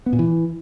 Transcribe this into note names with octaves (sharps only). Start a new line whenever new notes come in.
B3
A#2
E3